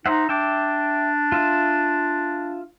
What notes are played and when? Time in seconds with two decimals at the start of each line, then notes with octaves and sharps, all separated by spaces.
0.06 D#4 C5 E5 F#5
0.29 D4 E5 G5 D6
1.32 F4 E5